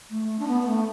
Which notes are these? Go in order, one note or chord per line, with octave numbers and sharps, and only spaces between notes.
A3
D4
B3
B3
A3